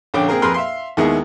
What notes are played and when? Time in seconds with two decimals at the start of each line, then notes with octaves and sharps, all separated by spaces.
0.14 A#1 D3 C#4 G5 D6
0.28 A#3 C4 G#4 A#4
0.42 F2 G#4 A#4 B4 C6 F6
0.54 E5 F5 C6
0.97 D#2 D#3 G#3 B3 E4 G#4